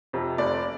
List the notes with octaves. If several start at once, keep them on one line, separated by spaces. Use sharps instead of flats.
F2 C3
F1 D5